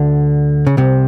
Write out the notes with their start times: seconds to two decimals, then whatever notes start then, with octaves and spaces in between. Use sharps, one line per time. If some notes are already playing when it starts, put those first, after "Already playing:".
Already playing: D2 D3
0.67 C#3
0.77 C2 C3